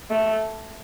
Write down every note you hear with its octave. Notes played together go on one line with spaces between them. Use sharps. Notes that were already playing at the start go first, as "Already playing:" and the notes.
A3